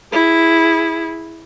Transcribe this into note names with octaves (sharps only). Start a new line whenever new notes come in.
E4 G#4